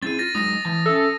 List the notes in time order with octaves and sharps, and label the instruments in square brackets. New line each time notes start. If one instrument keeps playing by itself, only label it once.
[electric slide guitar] C4 E4 G#4 [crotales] A6 D#7
[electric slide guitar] F4 [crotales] A6 A#6
[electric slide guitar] F#3 G#3 D#4 [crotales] D#6 A#6
[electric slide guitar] E3 A5
[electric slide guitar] C#4 E5 [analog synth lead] A4